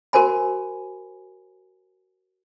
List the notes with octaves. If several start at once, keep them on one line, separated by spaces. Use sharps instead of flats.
F#4 A#4 C5 G#5 B5